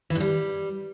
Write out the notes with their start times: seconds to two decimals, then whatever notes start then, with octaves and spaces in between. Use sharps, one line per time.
0.10 E3
0.15 G2
0.20 G3